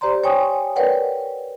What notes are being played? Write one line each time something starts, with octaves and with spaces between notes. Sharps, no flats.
G4 C5 D5 A#5 C6
C#5 G5 G#5 C#6 D#6
A#4 B4 C#5 D5 F#5 G5